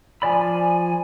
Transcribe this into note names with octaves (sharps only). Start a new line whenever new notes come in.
F3 D5 G#5 B5